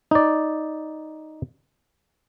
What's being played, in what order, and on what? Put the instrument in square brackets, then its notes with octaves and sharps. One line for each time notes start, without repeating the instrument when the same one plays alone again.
[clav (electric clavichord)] D#4 D5